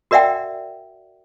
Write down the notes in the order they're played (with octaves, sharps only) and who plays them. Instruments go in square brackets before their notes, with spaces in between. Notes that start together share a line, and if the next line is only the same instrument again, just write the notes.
[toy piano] F#4 A#4 D5 E5 F#5 G5